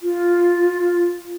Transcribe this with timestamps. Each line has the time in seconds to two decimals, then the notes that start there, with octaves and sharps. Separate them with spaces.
0.03 F4